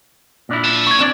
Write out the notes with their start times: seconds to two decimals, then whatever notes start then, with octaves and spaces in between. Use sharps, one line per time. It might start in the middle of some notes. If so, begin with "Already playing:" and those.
0.49 A#2 D4 E4
0.64 F5 A5
0.87 C#6 G#6
0.99 C4 D4 D5 E7